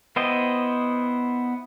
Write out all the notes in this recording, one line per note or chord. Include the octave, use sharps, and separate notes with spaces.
B3 E4 C5 D#5 G5